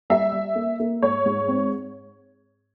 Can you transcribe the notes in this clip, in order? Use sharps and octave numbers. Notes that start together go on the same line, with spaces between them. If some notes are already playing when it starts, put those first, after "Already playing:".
G3 E5
G3
A#3
A#3
G#2 C#5
G#2
C4